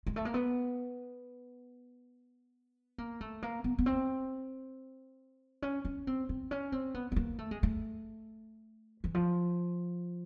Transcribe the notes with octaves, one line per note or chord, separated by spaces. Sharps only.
G#3
A3
A#3
B3
A#3
A3
A#3
B3
B3
C4
C#4
C#4
C4
C4
C#4
C4
B3
B3
A#3
A3
G#3
A3
E3
F3